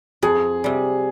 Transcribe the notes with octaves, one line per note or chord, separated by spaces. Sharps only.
F2 G#4
C3 G3